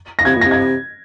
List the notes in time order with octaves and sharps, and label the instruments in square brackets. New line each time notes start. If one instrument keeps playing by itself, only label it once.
[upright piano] A#6
[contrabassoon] C3 [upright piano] G#6
[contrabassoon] A#2
[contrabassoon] C3 [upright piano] A#6
[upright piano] G#6